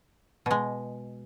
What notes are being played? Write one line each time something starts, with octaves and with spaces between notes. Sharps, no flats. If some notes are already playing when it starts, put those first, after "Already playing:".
B2 G#3